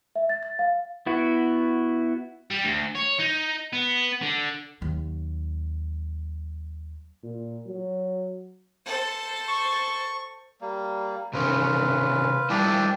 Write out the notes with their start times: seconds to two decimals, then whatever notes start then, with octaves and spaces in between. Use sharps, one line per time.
0.16 E5
0.29 A6
0.43 A6
0.59 F5
1.06 B3 E4 F#4
2.51 G3
2.65 D2
2.96 C#5
3.20 D#4
3.73 B3
4.21 D3
4.81 D#2 F#3
7.24 A#2
7.67 F#3
8.86 A4 C5
9.48 C#6
10.61 G3 A#3
11.33 C3 D#3 C#4 F4 B4
12.50 G3 D4 E4 F4 G4 D5